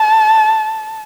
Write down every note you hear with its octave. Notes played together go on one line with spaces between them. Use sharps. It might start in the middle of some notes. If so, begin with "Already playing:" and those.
Already playing: A5